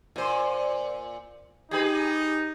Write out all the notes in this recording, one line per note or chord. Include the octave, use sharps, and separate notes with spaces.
A#2 C5
D#4 G4 G#4 B4